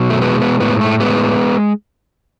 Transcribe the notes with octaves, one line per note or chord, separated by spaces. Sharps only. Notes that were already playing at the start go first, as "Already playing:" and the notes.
Already playing: B2 F#3
A3
G#3 B3
B3
A2 B3
A3
G#3 B3